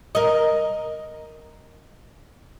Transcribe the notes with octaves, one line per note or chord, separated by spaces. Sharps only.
A#4 D#5